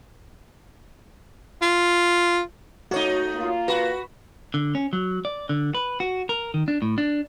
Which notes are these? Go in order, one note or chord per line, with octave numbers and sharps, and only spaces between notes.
F4
A3 D#4 F#4 C#5
A#3 F4
F#4 B4 B5
D3
C#4
F#3
D5
D3
B4
F#4
A#4
D#3
D4
A2
D4